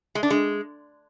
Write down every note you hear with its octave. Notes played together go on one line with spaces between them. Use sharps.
G#3
D4
G#3